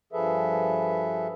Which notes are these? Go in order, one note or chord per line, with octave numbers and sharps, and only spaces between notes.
G2 F3 G#4 A4 B4 E5